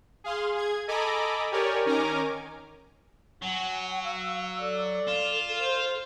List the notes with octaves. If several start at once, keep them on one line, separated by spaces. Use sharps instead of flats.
G#4 F5 C6
G#4 G#6
A4 D#5 G#5 A#5 B5 D6
G4 A#4 C#5 D5 G#5
D#3 C#4 A#4 G#5 A#5 D6
F#3 F#5 G#5
F5 E6
A4 D5
F4 E7
C5